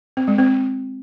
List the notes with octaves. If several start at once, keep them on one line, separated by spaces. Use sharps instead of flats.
C4
G#3
C4